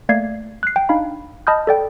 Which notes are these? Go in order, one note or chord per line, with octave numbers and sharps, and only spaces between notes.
A3 A#3 D5 G#6 C7
F#6 C7
G5
D4 D#4 F5 B5
D#5 A5 B5 D#6 F6 G6
A4 D5 G5